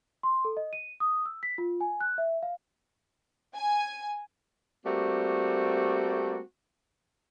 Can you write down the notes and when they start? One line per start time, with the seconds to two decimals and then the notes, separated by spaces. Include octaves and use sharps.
0.23 C6
0.45 A4
0.57 D#5
0.73 D#7
1.00 D#6
1.26 E6
1.43 B6
1.58 F4
1.81 G#5
2.01 F#6
2.18 E5
2.43 F5
3.55 G#5
4.85 G3 A3 A#3 C4 F#4